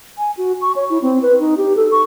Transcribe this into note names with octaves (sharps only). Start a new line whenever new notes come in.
G#5
F#4
C#6
C#5
E4
C4
B4
D#4
G4
A4
C#6